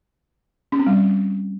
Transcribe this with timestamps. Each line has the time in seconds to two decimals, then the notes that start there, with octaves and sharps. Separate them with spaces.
0.72 C#4
0.79 C4
0.87 G3